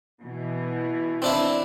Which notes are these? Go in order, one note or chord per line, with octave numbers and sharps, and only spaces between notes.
B2 E3
C4 D4 E4